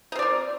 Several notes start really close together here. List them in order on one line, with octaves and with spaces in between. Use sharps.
D#4 C4 D5 A#4